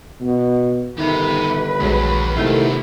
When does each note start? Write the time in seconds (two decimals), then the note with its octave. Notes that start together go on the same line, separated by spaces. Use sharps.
0.20 B2
0.98 G1 D#3 G4 B4 E5
1.80 A#1 D#2 F#3 G#3
2.37 C3 D#3 A3 B3 E4 F4